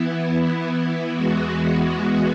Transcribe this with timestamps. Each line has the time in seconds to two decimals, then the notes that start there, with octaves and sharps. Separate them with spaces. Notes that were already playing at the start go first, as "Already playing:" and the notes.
Already playing: E3 B3 E4
1.15 E2 E3 G#3 B3 F#4